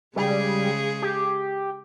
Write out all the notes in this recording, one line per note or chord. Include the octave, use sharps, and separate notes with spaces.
C#3 G3 G#3 G#4
G4